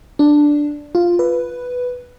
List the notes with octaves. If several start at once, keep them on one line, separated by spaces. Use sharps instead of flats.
D4
F4
B4